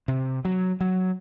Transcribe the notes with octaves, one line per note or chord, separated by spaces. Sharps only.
C3
F#3
F#3